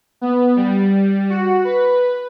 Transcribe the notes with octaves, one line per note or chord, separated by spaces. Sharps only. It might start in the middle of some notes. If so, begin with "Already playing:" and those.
B3
G3
F#4
B4